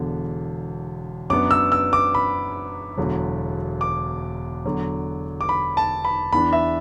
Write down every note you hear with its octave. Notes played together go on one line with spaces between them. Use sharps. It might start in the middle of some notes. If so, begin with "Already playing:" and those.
Already playing: E1 E2 D3
F#2 F#3 B3 D4 D6
E6
E6
D6
B5
E1 E2 D3 F#3
D6
E2 D3 F#3
D6
B5
A5
B5
E2 E3 D4 B5
E5